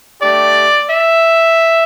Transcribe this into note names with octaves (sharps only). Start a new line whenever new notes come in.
A3 D4 G4 D5
E5